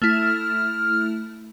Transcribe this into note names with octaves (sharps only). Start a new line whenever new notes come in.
A3 E4 F6